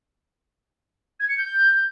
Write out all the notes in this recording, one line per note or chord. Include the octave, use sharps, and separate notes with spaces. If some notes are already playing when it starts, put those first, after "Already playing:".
G#6
C#7
G6